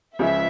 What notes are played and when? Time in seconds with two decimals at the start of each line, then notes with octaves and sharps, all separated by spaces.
0.19 C#2 C#3 F3 G#3 E5